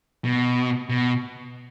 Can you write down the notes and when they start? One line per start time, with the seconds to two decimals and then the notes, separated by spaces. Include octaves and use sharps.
0.25 B2
0.89 B2